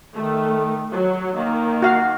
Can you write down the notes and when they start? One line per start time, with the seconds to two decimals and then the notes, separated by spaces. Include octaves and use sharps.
0.14 D#3 A3
0.91 F#3
1.35 D#3 A#3
1.82 F#4 F5